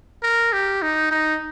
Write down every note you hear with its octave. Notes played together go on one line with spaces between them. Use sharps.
A#4
G4
D#4
D#4